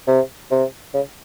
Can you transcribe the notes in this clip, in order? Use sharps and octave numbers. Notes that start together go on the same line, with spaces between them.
C3
C3
C#3